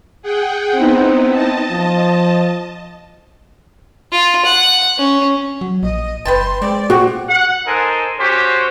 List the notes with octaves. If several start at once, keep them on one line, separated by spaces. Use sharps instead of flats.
G#4 F#5 G5
B3 C4 D#4 E4
D#5 A5
F3
F4
F#5
C#4
F#3
A#1 D#5
F#1 B4 G5 A5 C6
G#3 C4 D5
A#2 C4 F#4 G4
F#5
D#4 A4 A#4 C5 G#5
C#4 F#4 G4 C5